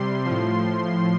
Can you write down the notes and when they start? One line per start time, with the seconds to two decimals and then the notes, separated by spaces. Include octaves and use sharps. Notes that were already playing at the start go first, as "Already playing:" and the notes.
Already playing: C3 G3 C6
0.25 A2 F3